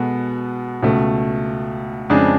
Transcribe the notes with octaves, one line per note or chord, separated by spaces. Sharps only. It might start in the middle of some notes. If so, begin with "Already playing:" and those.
Already playing: B2 G#3 B3 F#4 A4
C#2 B2 A3
F2 C#3 G#3 D4 G#4